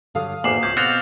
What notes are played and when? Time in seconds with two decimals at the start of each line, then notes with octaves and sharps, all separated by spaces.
0.15 G2 D3 F#3 A4 F5 D#6
0.44 G#1 E2 A#3 D6 C7 F#7
0.63 G#1 C#2 C#4 D6 G6
0.77 B2 C4 F#4 F6 A6 F7